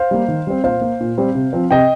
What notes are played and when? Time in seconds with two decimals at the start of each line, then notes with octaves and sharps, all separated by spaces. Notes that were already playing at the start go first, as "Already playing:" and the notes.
Already playing: C5 F5
0.11 G3 A#3
0.28 D#3
0.47 G3 C4
0.64 A#2 C5 F5
0.81 A#3
1.00 A#2
1.18 G3 C4
1.35 C3
1.53 F3 C4
1.71 C3 D#5 G5